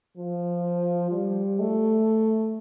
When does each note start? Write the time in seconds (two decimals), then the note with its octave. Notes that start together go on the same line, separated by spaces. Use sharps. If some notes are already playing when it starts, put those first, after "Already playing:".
0.17 F3
1.11 G3
1.60 A3